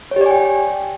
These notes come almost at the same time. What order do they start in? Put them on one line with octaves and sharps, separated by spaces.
C#5 G4 D5 G#5 G5